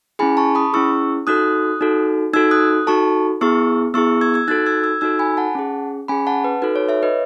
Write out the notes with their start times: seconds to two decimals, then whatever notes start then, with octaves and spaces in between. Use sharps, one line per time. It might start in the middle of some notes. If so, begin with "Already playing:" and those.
0.19 C#4 E4 G#4 G#5 B5
0.37 A5 C#6
0.55 B5 D#6
0.73 C#4 E4 G#4 C#6 E6
1.27 D#4 F#4 A4 D#6 F#6
1.81 D#4 F#4 A4
2.34 D#4 F#4 A4 E6 G#6
2.51 D#6 F#6
2.87 D#4 F#4 A4 A5 C#6
3.41 B3 E4 G#4 C#6 E6
3.94 B3 E4 G#4 C#6 E6
4.21 E6 G#6
4.34 E6 G#6
4.48 D#4 F#4 A4 F#6 A6
4.66 E6 G#6
4.84 E6 G#6
5.01 D#4 F#4 A4 E6 G#6
5.19 G#5 B5
5.37 F#5 A5
5.55 C#4 G#4
6.08 C#4 G#4 G#5 B5
6.27 F#5 A5
6.44 B4
6.62 D#4 F#4 A4 B4
6.76 C#5
6.89 C#5 E5
7.03 B4 D#5